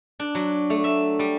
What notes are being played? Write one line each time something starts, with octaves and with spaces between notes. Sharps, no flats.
D4
F#3
A3
E5
G3